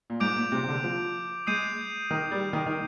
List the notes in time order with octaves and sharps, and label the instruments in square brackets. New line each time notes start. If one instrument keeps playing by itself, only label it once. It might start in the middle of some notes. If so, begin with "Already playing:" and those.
[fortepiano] A#2
[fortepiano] G#2 [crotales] D6 G6 D7 F7
[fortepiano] A#2
C3
C3
D3
F3
[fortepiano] G#3 [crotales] D#6 G6 C7 D#7
[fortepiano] D#3
G3
D#3
D#3